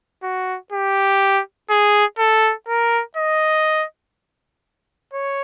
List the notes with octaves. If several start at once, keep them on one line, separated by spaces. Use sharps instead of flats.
F#4
G4
G#4
A4
A#4
D#5
C#5